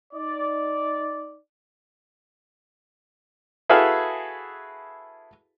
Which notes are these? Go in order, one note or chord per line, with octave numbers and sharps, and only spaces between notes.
D#4 D5
E4 F#4 G#4 A4 B4 F5